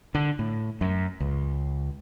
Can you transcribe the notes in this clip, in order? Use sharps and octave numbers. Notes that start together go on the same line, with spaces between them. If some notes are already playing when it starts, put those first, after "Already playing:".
D3
A2
F#2
C#2